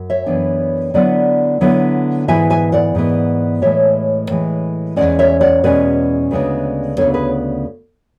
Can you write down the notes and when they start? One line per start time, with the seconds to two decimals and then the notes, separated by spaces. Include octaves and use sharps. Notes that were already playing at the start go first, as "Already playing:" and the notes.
Already playing: F#2
0.10 C#5 E5
0.26 F#2 E3 B3 D4
0.94 D3 F#3 B3 E4 D5 F#5
1.61 D3 F#3 B3 E4
2.28 G#2 E3 B3 E4 E5 G#5
2.50 E5 G#5
2.72 D5 F#5
2.95 G#2 E3 B3 E4
3.62 A2 E3 G#3 C#5 E5
4.30 A2 E3 G#3
4.96 E2 B2 G#3 C#4 D5 F#5
5.19 C#5 E5
5.41 D5 F#5
5.64 E2 B2 G#3 C#4 B4 D5
6.31 D2 C#3 G#3 B3 D4
6.97 D2 C#3 G#3 B3 D4 A4 C#5
7.14 G#4 B4